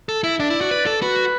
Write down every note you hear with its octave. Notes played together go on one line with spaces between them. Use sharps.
A4
E4 E5
D4 D5
E4
F#4
B4
A4
F#4 B4